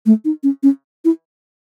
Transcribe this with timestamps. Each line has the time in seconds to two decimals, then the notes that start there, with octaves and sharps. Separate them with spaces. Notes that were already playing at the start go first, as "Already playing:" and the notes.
0.06 A3
0.25 D#4
0.43 C#4
0.63 C#4
1.05 E4